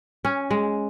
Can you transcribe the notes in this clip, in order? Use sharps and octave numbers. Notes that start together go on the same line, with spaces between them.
C#4
G#3